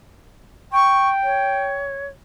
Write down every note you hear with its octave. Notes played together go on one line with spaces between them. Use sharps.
G5 C#6
C#5